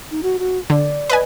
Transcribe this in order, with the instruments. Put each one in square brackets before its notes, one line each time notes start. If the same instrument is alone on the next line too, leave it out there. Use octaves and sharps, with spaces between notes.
[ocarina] D#4
F#4
F#4
[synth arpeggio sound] D3 [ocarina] D5
[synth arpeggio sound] B4 D#5 G#5